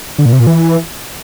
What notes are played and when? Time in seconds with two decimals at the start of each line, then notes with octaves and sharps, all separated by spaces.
0.18 D3
0.26 A#2
0.33 C3
0.40 A#2
0.47 E3